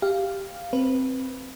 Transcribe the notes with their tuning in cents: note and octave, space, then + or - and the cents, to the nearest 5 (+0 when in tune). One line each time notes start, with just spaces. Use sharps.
G4 +0 F5 -5
C4 +0 B4 -10